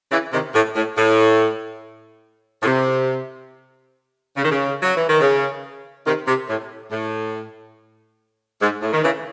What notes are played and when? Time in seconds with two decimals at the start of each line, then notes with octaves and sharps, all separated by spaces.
0.11 C#3 E3
0.32 C3 D#3
0.54 A2
0.75 A2
0.96 A2
2.62 A2
2.66 C3
4.36 C#3
4.43 D#3
4.50 C#3
4.83 F#3
4.96 E3
5.08 D#3
5.21 C#3
6.06 C3 D#3
6.27 C3
6.48 A2
6.91 A2
8.61 G#2
8.82 A2
8.92 D#3
9.03 C#3 E3